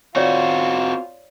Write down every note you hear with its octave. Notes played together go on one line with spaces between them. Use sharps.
C4 F4 F#4 C#5 D5